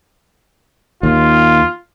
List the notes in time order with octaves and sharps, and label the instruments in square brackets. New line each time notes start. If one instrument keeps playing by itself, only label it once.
[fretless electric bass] D#2 [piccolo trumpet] F4